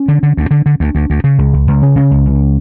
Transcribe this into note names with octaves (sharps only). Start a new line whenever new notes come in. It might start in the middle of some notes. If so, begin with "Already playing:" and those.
Already playing: C#4
D3
D3
D2
D3
D3
D2
D2
D2
C#3
C#2
C#2
C#2
C#3 C#4
C#3
C#2
C#2